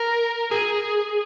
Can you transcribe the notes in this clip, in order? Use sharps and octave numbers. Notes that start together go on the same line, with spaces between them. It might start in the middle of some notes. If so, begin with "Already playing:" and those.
Already playing: A#4
G#4